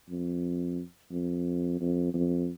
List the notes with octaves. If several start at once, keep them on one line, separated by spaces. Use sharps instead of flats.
F2
F2
F2
F2